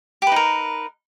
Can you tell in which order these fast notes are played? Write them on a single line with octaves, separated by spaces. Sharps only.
G4 B4 D#4 A#4